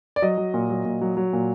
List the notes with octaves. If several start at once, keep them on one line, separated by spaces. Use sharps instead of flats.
D5
F#3 D#5
F#3
A#2
F#3
A#2
F#3
F#3
A#2